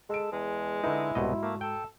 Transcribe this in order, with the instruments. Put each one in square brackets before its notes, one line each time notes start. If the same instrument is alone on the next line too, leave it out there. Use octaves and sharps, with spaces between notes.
[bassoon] G#3 [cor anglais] A4 [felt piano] A5 D7
[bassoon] E2 [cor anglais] G#3
[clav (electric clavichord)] D3 D#4 [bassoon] E4 [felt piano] B4
[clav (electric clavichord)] C2 B2 D#5 [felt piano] G#2 F#4 C6
[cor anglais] A3 [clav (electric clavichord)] A#3
[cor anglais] A4 [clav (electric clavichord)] G5